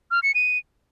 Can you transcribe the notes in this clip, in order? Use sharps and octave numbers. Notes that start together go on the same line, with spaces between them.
F6
C#7
D#7